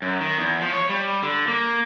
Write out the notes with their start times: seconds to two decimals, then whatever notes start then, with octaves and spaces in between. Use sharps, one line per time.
0.02 F#2
0.21 D#3
0.38 E2
0.61 F3
0.72 C#5
0.89 G3
1.22 D3
1.48 A#3